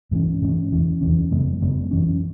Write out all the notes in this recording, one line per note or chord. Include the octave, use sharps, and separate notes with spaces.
G#2 E3 G#3 C#4
G#2 E3 G#3 C#4
E2 E3 C#4
E2 E3 C#4
F#2 C#3 G#3 B3
F#2 C#3 G#3 B3
F#2 E3 C#4